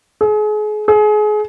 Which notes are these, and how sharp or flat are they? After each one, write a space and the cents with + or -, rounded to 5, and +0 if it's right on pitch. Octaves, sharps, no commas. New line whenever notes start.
G#4 +35
G#4 +30